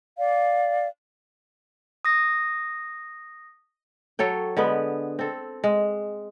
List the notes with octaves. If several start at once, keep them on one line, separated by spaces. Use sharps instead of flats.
D5 F5
D#6 A#6
F#3 A4 C#5 G5
D3 G#3 B3 B4
C4 A4
G#3